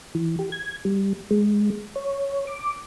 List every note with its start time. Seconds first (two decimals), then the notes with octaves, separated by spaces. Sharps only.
0.15 E3
0.39 G4
0.52 G#6
0.85 G3
1.31 G#3
1.96 C#5
2.47 D6